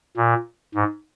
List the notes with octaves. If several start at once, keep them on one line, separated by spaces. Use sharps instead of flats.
A#2
G#2